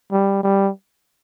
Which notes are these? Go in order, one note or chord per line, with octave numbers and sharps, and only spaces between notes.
G3
G3